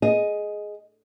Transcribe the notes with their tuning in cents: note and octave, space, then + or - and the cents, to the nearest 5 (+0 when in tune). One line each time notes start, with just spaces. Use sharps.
G#4 +10 D#5 +0